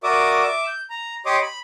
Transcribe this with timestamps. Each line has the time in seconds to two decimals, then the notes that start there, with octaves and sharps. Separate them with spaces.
0.04 F#4 A#4 D5 E5 D6 D#6
0.43 E5 D6
0.67 G6
0.90 A#5
1.26 G4 C#5 D#5 C6 D6 D#6
1.42 B5